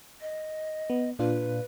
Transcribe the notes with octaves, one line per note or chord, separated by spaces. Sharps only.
D#5
B3
A#2 D4 F4 B4